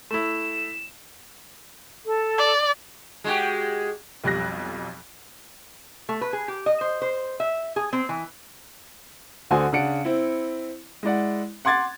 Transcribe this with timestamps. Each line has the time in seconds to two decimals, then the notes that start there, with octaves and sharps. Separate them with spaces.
0.11 A3 E4 E7
2.05 A4
2.38 D5
3.24 G#3 F#4 G4
4.24 B1 F2 G3 F#6 A#6
6.09 A3
6.21 B4
6.33 G#4
6.48 G4
6.66 D#5
6.81 C5
7.02 C5
7.40 E5
7.76 G#4
7.93 C4
8.09 E3
9.50 D2 D3 F#4 C5 G#5 D#6
9.73 C#3 D4 F#5 C#7 D7
10.05 C4 E4
11.03 G#3 E4 D5 F#5
11.65 F#5 C6 D6 G#6 A6